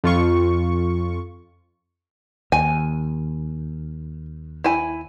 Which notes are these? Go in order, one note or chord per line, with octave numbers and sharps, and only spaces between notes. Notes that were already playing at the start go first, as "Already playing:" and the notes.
F2 F4 C#6
D#2 G#5
E4 G#5